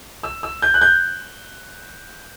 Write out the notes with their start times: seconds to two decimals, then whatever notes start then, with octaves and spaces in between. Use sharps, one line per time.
0.23 E6
0.43 E6
0.62 G6
0.74 F#6
0.81 G6